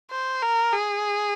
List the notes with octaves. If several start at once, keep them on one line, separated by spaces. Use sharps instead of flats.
C5
A#4
G#4